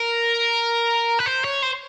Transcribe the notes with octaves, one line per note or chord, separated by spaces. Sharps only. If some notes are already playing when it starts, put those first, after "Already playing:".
Already playing: A#4
B4
C5
C#5
C5